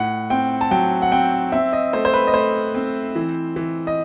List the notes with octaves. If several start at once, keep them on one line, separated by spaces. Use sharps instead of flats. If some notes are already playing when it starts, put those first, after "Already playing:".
Already playing: A2 F#5
C4 G5
A5
F#3 G5
F#5
C4 G5
C4 E5
D#5
A3 C5
C5
B4
D#5
A3 C5
C4
E3
E3
D#5